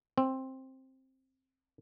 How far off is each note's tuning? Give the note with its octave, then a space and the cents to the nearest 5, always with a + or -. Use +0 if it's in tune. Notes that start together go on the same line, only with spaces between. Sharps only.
C4 +10